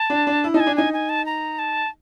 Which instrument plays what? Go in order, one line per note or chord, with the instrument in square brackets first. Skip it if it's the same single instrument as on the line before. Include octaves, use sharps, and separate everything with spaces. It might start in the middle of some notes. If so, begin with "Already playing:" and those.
Already playing: [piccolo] A5
[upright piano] D4
D4
E4
[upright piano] D#4 [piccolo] A5
[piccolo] G#5
[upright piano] D4
[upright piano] D#4 [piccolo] G#5
[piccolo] G#5
A5
A#5
A5